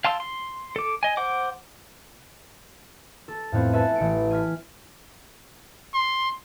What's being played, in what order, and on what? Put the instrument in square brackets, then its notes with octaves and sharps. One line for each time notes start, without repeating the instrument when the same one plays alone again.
[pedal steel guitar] F5 A5 C6 E6
C6
A4 D6
D#5 G#5
C5 F#5 D6
[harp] A4
F2 A2 B3 C4
A4 B4 E5 G#5 A5
A1 C#7 D7
G#5 F6 B6
[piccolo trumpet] C6